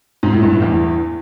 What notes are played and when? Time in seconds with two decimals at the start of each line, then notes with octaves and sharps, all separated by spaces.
0.23 G#2
0.33 A2
0.42 G2
0.52 A2
0.62 E2